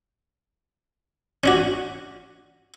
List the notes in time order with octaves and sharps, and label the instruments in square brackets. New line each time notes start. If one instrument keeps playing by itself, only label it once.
[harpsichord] C#4 D4 F#4